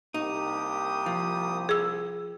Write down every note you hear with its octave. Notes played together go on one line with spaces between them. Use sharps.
C2 A#3 D#4 G4 D#6
F3
G#4 E6